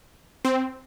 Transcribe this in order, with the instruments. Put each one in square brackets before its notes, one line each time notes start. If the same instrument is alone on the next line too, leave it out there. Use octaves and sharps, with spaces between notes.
[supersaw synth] C4